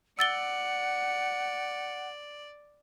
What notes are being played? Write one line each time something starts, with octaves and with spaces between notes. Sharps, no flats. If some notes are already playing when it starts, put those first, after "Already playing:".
D5 F#5 E6 A6 C#7 G7